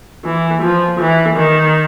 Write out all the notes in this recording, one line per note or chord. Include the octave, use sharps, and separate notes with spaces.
E3
F3
E3
D#3